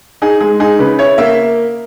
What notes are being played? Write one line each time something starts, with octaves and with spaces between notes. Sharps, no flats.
D#4 G#4
G#3 G#4
D#4 G#4
C#3 B4
E4 C#5
A#3 E5